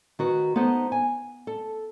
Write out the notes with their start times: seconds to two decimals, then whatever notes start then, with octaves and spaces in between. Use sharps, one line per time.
0.19 D#3 F#4 B4
0.56 B3 D#4 A4 C5
0.92 G#5
1.47 A4